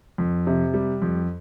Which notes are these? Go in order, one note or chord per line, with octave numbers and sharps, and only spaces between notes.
F2
C3
G3
F2